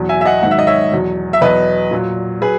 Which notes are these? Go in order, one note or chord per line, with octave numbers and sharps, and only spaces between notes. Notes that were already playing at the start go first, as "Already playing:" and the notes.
Already playing: E2 B2 F#3
E5 G#5
E5
D#5 F#5
G#2 D#3 F#3 F#5
E5
D#5
C#5 E5
E2 B2 F#3
E5
E2 B2 F#3 B4 D#5
A#2 F#3
F#3 G#4 B4